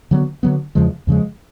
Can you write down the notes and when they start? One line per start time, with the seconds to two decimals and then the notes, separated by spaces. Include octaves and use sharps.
0.11 D3 F#3 B3
0.43 D3 F#3 B3
0.75 E2 C#3 F3 G#3
1.07 E2 C#3 F3 G#3